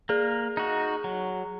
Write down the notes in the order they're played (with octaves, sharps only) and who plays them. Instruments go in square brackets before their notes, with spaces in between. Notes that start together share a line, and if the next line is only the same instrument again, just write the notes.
[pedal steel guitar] A#3 [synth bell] G#4
[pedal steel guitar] D#4 F#4
F#3